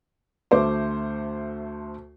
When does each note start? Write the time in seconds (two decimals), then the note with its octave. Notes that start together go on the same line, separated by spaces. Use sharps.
0.51 D2 A3 C5 D6